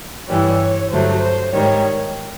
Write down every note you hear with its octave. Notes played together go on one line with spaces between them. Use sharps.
G2 E3 G3 C#5
G2 D3 F#3 A3 C5
C5
G#2 D#3 G3 C#5